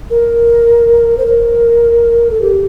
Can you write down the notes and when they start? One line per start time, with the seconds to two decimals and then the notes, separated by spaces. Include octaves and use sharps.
0.10 A#4
1.18 C5
1.26 A#4
2.31 A4
2.41 G4